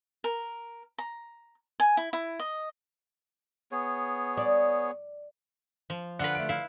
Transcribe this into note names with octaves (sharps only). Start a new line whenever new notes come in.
A#4
A#5
G#5
E4
E4
D#5
B3 G#4 C#5
D5
F3
D3 F4 B4 F#5
A3 D7
E4 F5